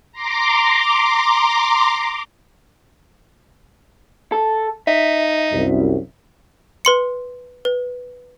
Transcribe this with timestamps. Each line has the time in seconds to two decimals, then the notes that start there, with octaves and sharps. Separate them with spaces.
0.12 A#5 C6 D6
4.32 A4
4.87 D#4 E5
5.52 C2 F#2
6.85 B4 C6 C#7
7.65 B4